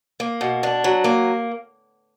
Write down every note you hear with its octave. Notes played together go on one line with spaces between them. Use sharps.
A#3
B2
D4
F#3
A#3